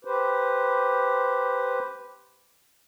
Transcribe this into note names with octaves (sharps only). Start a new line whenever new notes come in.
G4 B4 C5